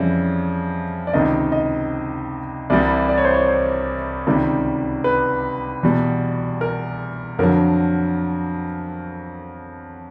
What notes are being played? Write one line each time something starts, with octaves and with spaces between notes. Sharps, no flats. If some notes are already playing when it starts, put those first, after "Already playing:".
Already playing: F2 C#3 E3 G3
D5
C#2 C3 D#3 D#5
D#5
C2 C3 E3 G3 D5
D5
C#5
C5
C#5
C5
C#2 C3 D#3 G3
B4
E2 B2 G3
A#4
F2 D3 F#3 A#4